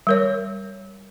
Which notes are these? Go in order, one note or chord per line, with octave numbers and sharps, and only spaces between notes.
G3 A#4 C#5